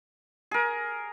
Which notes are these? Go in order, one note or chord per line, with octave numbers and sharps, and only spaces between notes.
G#4 A#4